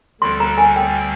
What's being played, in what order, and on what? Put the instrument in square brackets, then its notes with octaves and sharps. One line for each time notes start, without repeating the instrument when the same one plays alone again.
[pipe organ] D2 D3 G3 C4 [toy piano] C6
[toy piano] A#5
G#5
G5